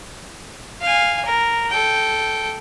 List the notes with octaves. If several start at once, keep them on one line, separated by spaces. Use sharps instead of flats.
F5 G#5
A#4
A4 G5